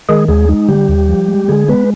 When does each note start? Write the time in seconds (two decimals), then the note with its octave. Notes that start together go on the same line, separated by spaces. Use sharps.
0.09 D#3 G#3 G#4
0.28 D#2 G#3 G#4
0.49 G#3 D#4
0.68 D3 G3 G4
0.89 D#2
1.09 F3
1.28 G#3
1.48 D3 G#3 G#4
1.68 G#3 B3 B4